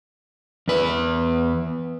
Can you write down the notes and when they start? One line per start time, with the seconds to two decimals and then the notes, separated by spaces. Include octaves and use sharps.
0.68 E2 B4